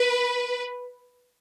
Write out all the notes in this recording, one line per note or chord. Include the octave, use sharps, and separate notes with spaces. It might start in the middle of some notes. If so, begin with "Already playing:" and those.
Already playing: B4